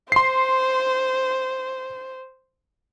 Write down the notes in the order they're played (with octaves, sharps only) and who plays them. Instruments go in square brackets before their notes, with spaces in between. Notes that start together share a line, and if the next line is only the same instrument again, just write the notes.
[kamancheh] C5 [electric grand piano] C6 C7